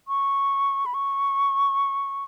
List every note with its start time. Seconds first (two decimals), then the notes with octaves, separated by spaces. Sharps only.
0.08 C#6
0.86 B5
0.94 C#6